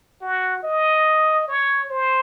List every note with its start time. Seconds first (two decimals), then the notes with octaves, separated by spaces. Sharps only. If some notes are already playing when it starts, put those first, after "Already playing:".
0.21 F#4
0.63 D#5
1.48 C#5
1.90 C5